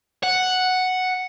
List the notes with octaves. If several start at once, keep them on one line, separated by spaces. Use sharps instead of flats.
F#5